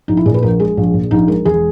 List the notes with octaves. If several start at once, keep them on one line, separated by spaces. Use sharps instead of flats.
A#1 D#4
E4
A#2 G#4
B4
A#1 A#4
G#3 G#4
A#1
A#2
A#1 D#4
G#3 A#4
E1 G#4